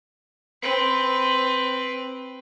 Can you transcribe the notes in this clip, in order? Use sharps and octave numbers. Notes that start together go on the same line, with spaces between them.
C4 B4